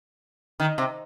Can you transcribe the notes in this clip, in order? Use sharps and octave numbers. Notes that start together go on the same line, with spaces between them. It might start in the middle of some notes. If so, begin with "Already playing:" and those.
D#3
C3